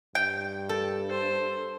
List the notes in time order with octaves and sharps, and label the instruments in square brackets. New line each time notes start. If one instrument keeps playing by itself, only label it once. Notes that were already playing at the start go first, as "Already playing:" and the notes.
[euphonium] G2 [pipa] G5
[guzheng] A4
[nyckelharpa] C5